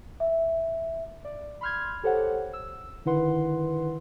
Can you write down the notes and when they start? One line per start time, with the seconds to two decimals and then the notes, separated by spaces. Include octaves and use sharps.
0.20 E5
1.25 D5
1.61 B5 C6 F6 G6 G#6
2.04 G4 A4 C5 C#5 F#5
2.53 E6
3.05 D3 D#3 E4 B4 F#5 C6